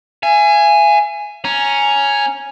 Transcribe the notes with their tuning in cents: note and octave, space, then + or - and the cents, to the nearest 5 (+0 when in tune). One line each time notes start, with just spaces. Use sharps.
E5 +45 G#5 +0
C#4 +0 A#5 +0